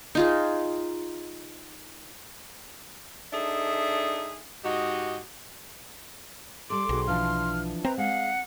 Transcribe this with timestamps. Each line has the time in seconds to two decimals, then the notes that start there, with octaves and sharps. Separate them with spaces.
0.15 D#4 F4 G#4
3.32 D4 D#4 G#4 A4 E5
4.64 G#2 F#4 G4 D#5
6.70 G3 A4 C6 D6
6.89 B1 F#4 G#4 G5
7.07 E3 F3 D4 F6
7.85 C4 B4 E5 A#5
7.98 G#3 F5 F#5